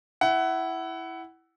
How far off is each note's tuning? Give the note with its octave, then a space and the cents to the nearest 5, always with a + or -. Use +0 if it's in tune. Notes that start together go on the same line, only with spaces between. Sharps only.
E4 +0 F#5 +20